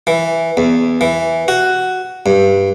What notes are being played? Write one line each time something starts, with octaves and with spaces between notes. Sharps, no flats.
E3
E2
E3
F#4
G2